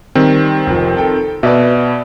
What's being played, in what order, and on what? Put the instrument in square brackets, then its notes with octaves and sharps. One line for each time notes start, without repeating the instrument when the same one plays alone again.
[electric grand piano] D#3 C4 [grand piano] G3
[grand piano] F1 F3
A4 G5
[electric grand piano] B2 [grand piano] B4 D5 E5